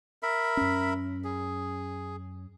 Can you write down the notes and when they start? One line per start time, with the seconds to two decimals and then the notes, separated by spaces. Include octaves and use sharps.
0.23 A#4 E5 B5
0.57 F#2 C#4
1.24 G#4